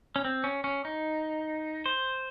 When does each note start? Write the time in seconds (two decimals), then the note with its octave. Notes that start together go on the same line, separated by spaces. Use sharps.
0.16 C#4
0.24 C4
0.44 C#4
0.64 C#4
0.85 D#4
1.86 C5